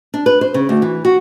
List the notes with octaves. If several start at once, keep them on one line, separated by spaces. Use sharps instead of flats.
D4
B4
C5
C#3
D2
E3
F#4